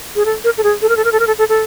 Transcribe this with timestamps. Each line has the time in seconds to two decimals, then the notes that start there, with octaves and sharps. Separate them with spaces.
0.16 G#4
0.25 A4
0.44 A#4
0.58 A4
0.63 G#4
0.82 A4
0.89 A#4
0.97 A4
1.04 A#4
1.12 A4
1.20 A#4
1.27 A4
1.39 A4
1.49 A4